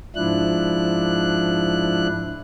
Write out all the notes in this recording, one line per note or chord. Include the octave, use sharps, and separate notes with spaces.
G#2 F3 D4 E4 F#6